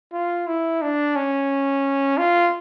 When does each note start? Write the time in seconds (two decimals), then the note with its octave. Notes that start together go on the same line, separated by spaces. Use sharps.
0.13 F4
0.47 E4
0.82 D4
1.16 C#4
2.18 F4